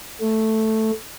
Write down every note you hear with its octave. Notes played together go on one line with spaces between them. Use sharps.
A3